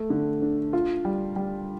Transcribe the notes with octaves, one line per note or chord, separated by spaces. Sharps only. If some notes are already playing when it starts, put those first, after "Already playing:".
Already playing: A3
D3
D4
F4
G3
G3